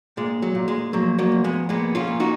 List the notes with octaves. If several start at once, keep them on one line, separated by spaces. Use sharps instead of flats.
A#2 G#3
F#3
A#2
G#3
F3 F#3 A#3
F#3 A#3
F3
G#3 B3
A#2 G#3 B3
C#4 F4
A#2
D#4 F#4